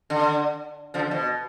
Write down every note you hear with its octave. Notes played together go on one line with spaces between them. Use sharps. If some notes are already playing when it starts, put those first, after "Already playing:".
D3
D3 F3
B2